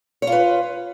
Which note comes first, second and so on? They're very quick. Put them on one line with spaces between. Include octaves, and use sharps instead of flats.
C#5 F4 B4